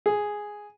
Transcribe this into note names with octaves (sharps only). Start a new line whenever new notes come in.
G#4